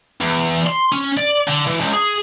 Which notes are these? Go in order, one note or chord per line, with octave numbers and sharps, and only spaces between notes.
E2
C6
C#4
D5
D3
E3
C#2
G#4